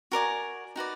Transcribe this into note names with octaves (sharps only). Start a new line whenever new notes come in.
F#4 A#4 D5 G#5
D#4 F#4 B4 D5